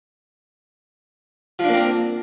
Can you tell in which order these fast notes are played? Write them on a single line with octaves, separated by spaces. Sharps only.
F3 D4 A#3 C4